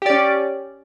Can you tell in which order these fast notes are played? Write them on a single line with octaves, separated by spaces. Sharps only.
G4 D5 C#4